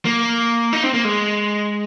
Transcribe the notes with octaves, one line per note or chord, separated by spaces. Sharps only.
A#3
D#4
C4
A#3
G#3